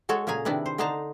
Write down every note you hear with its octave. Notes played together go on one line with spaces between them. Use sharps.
G#3 F#4 A4 C#5
A#2 C#3 G#4 G#5 A#5
C3 D#3 D4 E4 B4
C5
D3 D4 D#4 C5 A5 A#5